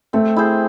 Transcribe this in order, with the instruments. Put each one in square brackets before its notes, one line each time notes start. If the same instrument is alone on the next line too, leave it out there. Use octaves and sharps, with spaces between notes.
[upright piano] A3 [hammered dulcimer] C4
[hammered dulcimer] E4 G#4 C5